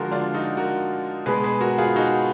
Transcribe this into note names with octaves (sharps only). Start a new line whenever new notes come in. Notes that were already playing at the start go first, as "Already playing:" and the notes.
Already playing: D3 F3 G#3 F#4 A#4
D4 F4
D#4 F#4
F#4 A#4
B2 G#3 G#4 B4
G#4 B4
F#4 A#4
F4 G#4
D#4 F#4